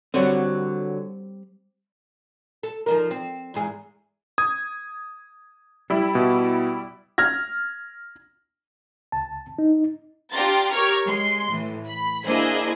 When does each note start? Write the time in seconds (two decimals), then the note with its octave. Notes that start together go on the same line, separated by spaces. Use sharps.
0.14 D3 F#3 G3 C4
2.63 A4
2.86 F3 D#4 A#4
3.11 C4
3.54 E2 G#2 G#4
4.38 D#6 G#6
5.90 G3 E4
6.15 B2
7.18 F6 G#6 A#6
9.12 C#2 A5
9.58 D#4
10.33 D4 F4 G4 A#5 C6 A6
10.71 G4 A#4 C#5 C#6 F6
11.06 G#3 C6
11.50 A2 E3
11.86 B5
12.25 A#3 D4 E4 G#4 C5 D#5